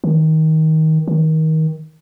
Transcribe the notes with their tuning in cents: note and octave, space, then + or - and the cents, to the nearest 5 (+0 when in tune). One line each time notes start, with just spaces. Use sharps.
D#3 +20
D#3 +25